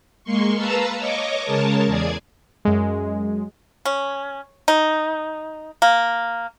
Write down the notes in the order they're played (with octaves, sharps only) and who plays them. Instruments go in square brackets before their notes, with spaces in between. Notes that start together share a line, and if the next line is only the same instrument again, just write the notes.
[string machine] G#3 A#3 C6 C#6
B4 F5 A5 A#5 E6
C#5 D#5 C#6 D6
C#3 G#3 A#4 C#5 A5
E2 G#4 D5 G#6
[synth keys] F#2 G#3
[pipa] C#4
D#4
A#3